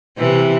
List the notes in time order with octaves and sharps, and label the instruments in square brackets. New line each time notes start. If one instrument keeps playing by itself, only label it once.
[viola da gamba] C3 E3